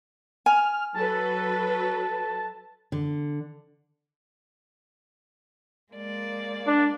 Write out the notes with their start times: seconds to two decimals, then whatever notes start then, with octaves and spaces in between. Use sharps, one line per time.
0.46 G#5 F6
0.95 F#3 A4 B4 A5
2.92 D3
5.93 G#3 A#3 D5
6.67 D4